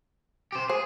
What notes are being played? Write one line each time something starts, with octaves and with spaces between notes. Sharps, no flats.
G4 C5
G#4 C5